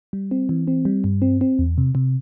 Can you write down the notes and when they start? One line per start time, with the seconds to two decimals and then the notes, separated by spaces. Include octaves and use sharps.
0.13 G3
0.31 C4
0.49 E3
0.68 C4
0.85 G3
1.04 G2
1.22 C4
1.41 C4
1.59 E2
1.78 C3
1.95 C3